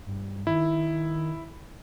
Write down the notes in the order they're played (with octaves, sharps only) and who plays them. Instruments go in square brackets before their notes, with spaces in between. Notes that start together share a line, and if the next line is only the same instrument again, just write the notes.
[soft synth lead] G2
[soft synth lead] D#3 [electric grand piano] E4